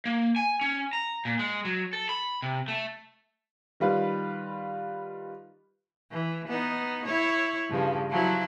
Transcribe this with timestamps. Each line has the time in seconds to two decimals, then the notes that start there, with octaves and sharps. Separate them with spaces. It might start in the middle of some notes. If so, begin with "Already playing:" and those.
0.05 A#3
0.36 G#5
0.61 C#4
0.93 A#5
1.25 A#2
1.39 G#3
1.65 F#3
1.93 A4
2.09 B5
2.42 C3
2.68 A3
3.80 D#3 G3 F4 B4
6.11 E3
6.48 B3 D#4
7.06 E4 C#5
7.70 G2 C#3 F3
8.10 F3 F#3 E4